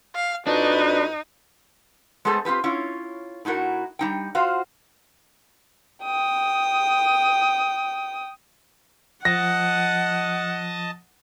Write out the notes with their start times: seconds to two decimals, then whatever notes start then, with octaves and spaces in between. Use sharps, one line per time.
0.15 F5
0.47 F2 D4 D#4 F#4 B4
2.25 G#3 A3 B3 G#4 A4 C5
2.45 C4 F4 G4 B4
2.64 C#4 E4 F4 C#5
3.45 A2 D#4 E4 F#4 A#4
3.99 G3 D#4 G5
4.35 F4 F#4 C5 F5
6.04 G5 D#6
9.25 F3 D#5 F#5 A5 A#6